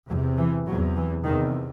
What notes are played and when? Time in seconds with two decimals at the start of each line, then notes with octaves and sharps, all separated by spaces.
0.10 E2 F#3
0.14 C3
0.38 E3
0.67 E2 C3 F#3
0.96 E3
1.24 E2 C3 D#3